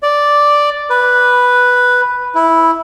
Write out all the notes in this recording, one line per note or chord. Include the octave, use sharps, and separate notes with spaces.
D5
B4
E4